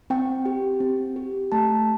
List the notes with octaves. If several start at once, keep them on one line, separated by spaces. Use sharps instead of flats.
C4 G5
G4
C4
G4
A3 A5